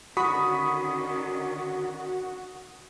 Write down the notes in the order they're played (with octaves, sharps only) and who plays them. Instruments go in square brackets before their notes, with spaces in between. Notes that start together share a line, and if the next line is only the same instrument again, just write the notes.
[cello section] D3 D#3 C#4 [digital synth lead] F#4 [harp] B5 [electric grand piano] C#6 D#6 B6